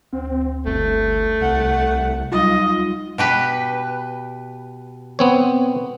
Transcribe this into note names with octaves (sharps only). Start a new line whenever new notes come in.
D2 C4
G1 A3
C2 F#5
F#3 G3 D#4 F4 D#5
B2 G4 B4
B3 C4 C#5